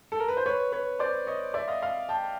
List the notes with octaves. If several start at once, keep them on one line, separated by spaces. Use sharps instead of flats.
A4
A#4
B4
C5
B4 C#5
B4 C#5
C5 D5
C#5 D#5
D5 E5
D#5 F5
D#5 F5
G5 A5